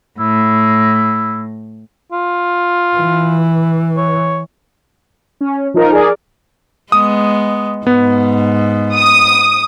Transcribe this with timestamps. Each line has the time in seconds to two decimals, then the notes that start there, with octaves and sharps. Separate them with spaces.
0.19 A2 E4
2.12 F4
2.97 E3
3.96 C#5
5.41 C#4
5.74 F3 D#4 A#4
5.92 G#4 A#4 D5
6.92 G#3 B3 D#6
7.87 G#2 B3
8.94 D#6